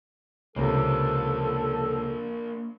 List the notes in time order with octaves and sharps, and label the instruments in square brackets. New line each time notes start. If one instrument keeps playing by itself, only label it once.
[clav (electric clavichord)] C#2 C3 [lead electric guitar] A#3 D4 [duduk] A4